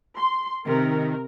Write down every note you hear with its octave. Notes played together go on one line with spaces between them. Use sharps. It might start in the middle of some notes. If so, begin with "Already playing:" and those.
C6
C3 D#3 A#4